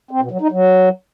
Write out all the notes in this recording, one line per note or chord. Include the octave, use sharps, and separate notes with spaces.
C4
B2
F#3
D#4
F#3